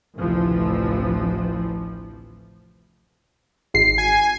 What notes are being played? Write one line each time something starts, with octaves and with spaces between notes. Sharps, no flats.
A1 D2 C3 E3 F3
G#1 C7
G#5